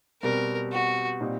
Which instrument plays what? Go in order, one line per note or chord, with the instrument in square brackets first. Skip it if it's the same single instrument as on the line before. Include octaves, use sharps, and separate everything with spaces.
[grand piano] B2 G3 C4 [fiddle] A#4
[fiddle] F#4
[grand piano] A#2 G3 C4 D#4